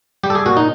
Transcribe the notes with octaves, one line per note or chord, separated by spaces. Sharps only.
G3 G4
A4
G#4
A#2 F#4
D#4